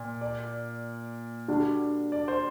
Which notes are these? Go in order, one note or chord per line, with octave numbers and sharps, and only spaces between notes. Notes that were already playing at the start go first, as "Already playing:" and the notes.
Already playing: A#2
D5
D3 G3 D4 F#4
D5
C5